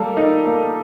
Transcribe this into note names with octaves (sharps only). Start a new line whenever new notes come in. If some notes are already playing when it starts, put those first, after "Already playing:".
Already playing: G3 A#3 A4
D#4
A#3